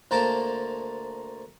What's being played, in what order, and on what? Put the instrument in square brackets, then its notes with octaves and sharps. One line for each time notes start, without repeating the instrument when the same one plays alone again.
[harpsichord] D2 A#3 A#4 C5 A5